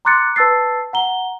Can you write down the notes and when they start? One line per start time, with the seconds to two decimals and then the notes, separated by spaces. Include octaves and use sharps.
0.05 A#5 C6 D6 F#6 A6 C#7
0.36 B4 A5 E6 A6 C7
0.93 F#5 A#5 G7